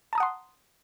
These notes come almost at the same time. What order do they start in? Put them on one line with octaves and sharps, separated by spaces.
A5 A#5 D#6 F#5 C6